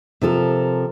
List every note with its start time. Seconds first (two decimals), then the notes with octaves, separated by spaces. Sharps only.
0.22 C3 F3 A4 A#4